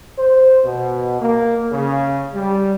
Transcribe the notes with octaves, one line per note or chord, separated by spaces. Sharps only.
C5
B2
A#3
C#3
G3